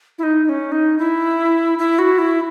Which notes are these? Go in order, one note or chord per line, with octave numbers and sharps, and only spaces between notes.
E4
D#4
D#4
C#4
D#4
E4
E4
F#4
E4